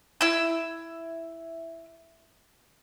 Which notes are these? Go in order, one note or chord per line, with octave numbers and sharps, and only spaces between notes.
E4 E6